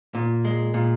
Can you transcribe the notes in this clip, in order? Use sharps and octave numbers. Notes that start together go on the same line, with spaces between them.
A#2
G#3
A#2